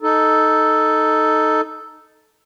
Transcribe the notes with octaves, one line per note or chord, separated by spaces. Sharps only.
D#4 A4